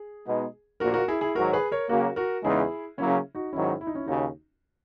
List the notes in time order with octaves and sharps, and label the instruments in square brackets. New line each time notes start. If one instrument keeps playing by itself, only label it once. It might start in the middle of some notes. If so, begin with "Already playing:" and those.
Already playing: [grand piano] G#4
[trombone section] B2 G#3 B3 D#4
[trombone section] A#1 A#2 A#3 [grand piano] F#4 A#4
[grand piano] F#4 A#4
E4 G#4
E4 G#4
[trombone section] G#2 D#3 F#3 [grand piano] F#4 A#4
[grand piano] G#4 B4
A#4 C#5
[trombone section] C#3 F#3 A#3 [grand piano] F#4 A#4
[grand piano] F#4 A#4
[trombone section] E2 C#3 G#3 D#4 [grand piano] E4 G#4
[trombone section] C#3 F#3 A#3 [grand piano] C#4 E4
[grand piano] D#4 F#4
[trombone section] G#2 D#3 F#3 [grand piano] C#4 E4
[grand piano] E4
D#4
C#4 E4
[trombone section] D#2 C#3 [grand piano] D#4 F#4